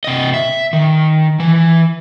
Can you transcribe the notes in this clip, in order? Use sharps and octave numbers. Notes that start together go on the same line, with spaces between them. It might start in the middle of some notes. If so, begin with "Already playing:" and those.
C3 D#5
E5
D#3
E3